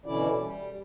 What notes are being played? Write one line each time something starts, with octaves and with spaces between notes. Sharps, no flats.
B2 D3 E3 C#4 E4 D5
G3